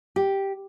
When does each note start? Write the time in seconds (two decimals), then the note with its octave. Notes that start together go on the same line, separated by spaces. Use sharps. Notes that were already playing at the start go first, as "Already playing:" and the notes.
0.16 G4